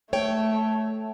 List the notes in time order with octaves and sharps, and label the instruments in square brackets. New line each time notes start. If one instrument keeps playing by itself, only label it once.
[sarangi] A3 [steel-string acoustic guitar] C#5 G5